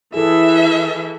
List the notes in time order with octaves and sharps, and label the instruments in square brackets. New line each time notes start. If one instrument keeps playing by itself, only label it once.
[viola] E3 [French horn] E4 [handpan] G#4 A4 [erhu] E5